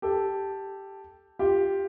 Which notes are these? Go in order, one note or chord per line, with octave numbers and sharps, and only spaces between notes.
G4 A4
F4 G4